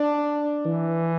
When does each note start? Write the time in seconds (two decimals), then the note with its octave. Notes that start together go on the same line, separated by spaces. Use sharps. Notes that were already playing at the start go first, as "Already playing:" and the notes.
Already playing: D4
0.66 E3